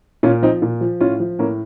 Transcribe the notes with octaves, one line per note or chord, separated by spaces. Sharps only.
A#2 C#4 F4
F3 C4 D#4
A#2
F3
A2 C#4 F4
F3
A2 A#3 C#4